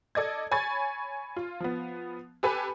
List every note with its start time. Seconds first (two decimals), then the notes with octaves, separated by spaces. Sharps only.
0.15 A4 D5 D#5 G#6
0.51 C#5 G#5 B5 C#6 G#6 A6
1.36 F4
1.60 F3 B3
2.43 G4 A4 B4 G#5 B5